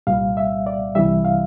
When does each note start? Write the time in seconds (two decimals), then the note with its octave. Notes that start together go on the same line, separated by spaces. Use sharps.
0.07 C2 A#2 G3 F5
0.37 E5
0.66 D5
0.95 C2 C3 E3 G3 E5
1.25 F5